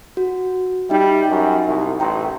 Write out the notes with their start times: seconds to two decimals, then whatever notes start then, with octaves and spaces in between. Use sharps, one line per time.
0.17 F#4
0.90 G3 D#4 E5
1.29 F#2
1.67 C2
2.00 A1 G5 A#5 C6